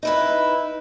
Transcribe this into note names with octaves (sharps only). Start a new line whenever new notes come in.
D#4 E4 B4